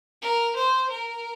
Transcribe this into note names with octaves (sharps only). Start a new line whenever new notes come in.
A#4
C5
A#4